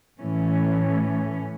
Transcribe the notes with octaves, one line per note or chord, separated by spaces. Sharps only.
A2 E3 A3 C#4